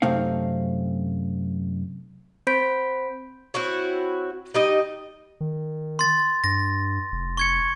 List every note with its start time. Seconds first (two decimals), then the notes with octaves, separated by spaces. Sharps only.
0.02 F#2 C3 A3 C4 D#4 F5
2.47 C4 C5 B5 G6 B6 D7
3.54 C4 E4 F#4 C#5
4.54 G3 D#4 D#5
5.40 D#3
5.99 C6 A6
6.44 G2 A#6
7.12 F1
7.37 C#6 G#6 C#7